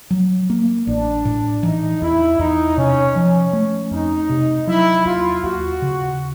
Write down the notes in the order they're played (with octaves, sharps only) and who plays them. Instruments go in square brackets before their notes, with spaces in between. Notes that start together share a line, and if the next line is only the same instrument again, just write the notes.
[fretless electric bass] F#3
A#3
[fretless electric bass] A1 [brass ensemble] D4
[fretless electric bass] A2
[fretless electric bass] E3 [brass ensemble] D#4
[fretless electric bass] E2 [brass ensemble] E4
[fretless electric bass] E2 [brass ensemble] D#4
[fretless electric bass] C3 [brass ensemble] C#4
[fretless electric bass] F3 [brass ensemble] C#4
[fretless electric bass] A3
[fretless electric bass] F2 [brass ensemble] D#4
[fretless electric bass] C3
[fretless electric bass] F#3 [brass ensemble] E4
[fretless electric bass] D#2 [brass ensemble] F4
[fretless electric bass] D#2 [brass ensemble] F#4
[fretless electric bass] C#3